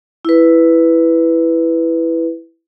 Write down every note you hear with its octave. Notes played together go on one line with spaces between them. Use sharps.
E4 B4